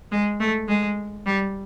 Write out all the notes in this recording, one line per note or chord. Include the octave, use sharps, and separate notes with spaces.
G#3
A3
G#3
G3